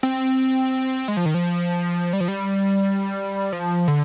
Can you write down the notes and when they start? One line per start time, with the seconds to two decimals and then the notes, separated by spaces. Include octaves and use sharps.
0.03 C4
1.08 G#3
1.17 F3
1.26 D#3
1.34 F3
2.13 G3
2.20 F3
2.28 G3
3.52 F3
3.88 D3